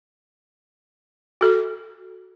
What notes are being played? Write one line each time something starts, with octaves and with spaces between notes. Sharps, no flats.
F#4 A4